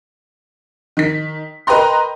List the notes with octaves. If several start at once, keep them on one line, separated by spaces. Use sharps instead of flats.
D#3 B6
A#4 B4 D#5 G5 A#5 C6